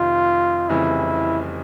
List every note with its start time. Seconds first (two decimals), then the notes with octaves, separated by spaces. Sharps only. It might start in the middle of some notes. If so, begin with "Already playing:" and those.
Already playing: F1 F2 C3 D#3 F4
0.69 F1 F2 C#3 E3 G3 E4